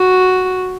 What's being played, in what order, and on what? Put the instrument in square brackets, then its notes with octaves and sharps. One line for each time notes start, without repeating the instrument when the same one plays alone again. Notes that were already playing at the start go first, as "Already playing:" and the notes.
Already playing: [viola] F#4